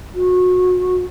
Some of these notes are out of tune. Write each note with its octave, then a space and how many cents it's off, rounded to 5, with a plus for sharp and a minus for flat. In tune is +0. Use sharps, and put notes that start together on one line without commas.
F#4 -25